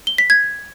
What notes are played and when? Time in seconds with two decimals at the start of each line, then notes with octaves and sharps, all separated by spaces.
0.07 G7
0.18 B6
0.30 G#6